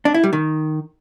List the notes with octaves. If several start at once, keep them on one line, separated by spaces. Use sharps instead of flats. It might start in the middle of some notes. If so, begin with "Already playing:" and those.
D4
E4
G3
D#3